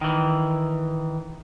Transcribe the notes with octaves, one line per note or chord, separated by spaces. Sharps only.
D#3 E3